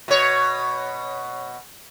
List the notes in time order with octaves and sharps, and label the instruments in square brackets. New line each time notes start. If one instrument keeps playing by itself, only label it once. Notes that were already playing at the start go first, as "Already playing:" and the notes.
[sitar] B2 C#5